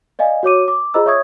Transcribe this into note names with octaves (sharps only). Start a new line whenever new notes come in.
D5 D#5 F5 G#5
F#4 C#5 D6 D#7
D6
F4 G#4 C5 D#5 A#5 E6
C#5 E5 C#6 D#6 G#6